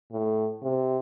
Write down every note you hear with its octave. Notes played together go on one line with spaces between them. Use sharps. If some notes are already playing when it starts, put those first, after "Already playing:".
A2
C3